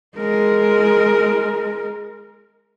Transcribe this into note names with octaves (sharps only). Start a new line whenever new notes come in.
G#3 A#4